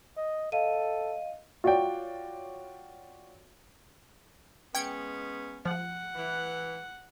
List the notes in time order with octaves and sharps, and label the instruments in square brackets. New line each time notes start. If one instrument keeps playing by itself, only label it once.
[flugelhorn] D#5
[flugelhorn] A4 [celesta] D#5 F5 D#7
[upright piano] F4 F#4 C#5 D5 G5
[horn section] G#3 B3 C#4 [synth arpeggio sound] G5 G#6 C#7
[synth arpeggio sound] F3 [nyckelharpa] F#5
[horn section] E3